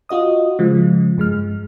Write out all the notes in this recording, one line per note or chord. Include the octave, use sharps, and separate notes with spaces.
F4 F#4 D#5 D#6
C#3 F3 G#3
G2 G#3 F6